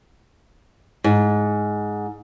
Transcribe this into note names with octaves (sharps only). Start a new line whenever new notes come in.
G#2